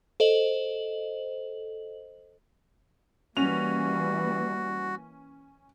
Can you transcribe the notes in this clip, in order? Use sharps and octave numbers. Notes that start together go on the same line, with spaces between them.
A4 C5 D#5 F#7
E3 G3 A#3 C#4 F#4 F7